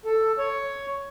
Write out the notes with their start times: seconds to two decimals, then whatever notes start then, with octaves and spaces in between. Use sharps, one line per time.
0.05 A4
0.38 C#5